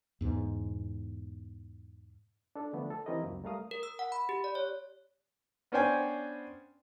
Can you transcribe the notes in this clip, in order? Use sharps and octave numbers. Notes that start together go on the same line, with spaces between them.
E2 G#2 B2
D4 A4
D3 F3 A3 B3 D4
A4
E3 C4 E4 G4 A#4 D#5
C#2 F#2 A#3
G3 A3 A#4 F5 D#6
A#4
E6
F#5
B5
G4
D5
C#5
B3 C#4 D4 C5 G5 G#5